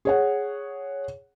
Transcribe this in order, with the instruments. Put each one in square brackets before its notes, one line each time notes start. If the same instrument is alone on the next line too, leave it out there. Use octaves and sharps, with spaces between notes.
[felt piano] G#4 C#5 F#5